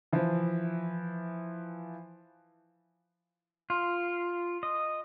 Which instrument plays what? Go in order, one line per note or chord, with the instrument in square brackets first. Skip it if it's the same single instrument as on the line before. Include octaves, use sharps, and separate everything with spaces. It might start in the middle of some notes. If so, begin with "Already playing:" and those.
[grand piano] E3 F3
[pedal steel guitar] F4
D#5